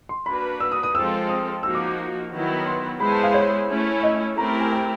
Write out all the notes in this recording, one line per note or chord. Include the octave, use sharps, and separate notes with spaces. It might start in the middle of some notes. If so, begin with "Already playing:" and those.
C6
A#3 D4 F#4 B4 B5
E6
D#6
D#6
F3 G#3 C4 F4 A4 E6
D#6
F3 A#3 D#4 F#4 E6
D6
D6
D#3 F#3 B3 E4
C6
G#3 B3 E4 G#4 C5 B5
A5
F5
C#5
A3 C#4 E4
D#5
A3 C4 E4 G4 A#4 A#5
G#5
G5